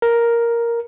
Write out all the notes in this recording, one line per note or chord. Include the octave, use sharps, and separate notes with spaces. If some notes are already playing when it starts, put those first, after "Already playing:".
A#4